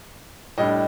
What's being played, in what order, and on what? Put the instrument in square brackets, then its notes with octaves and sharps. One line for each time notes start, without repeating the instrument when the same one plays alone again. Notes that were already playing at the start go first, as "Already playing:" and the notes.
[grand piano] A2 G3 D4 D#5